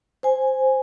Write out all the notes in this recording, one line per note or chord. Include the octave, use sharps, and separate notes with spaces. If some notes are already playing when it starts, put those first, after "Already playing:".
C5 G#5